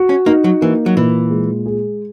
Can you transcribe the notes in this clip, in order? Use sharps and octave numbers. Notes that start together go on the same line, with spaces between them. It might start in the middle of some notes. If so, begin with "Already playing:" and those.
Already playing: F#4
C#4
A#3 D#4
F#3
E3 A#3
F#3
A#2 E3
G#3
G#4